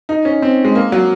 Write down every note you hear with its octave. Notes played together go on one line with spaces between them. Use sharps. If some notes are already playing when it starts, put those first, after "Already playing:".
D#4
C#4
C4
G#3
A#3
F#3